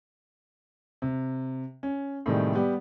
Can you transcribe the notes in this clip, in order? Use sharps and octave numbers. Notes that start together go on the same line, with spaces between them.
C3
C#4
A2 C3 D#3 G3 G#3
G3 B3 G4